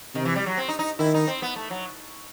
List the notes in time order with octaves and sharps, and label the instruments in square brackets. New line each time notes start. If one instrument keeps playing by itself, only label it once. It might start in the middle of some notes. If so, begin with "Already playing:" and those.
[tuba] C3 [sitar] D#3
[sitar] E3
G3
F#3
C4
D#4
D#4
[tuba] D#3 [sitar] E4
[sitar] D#4
C4
B3
A3
F#3